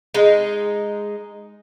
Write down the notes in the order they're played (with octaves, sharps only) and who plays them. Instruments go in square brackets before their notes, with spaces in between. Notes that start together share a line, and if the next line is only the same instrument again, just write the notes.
[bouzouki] G#3 D#4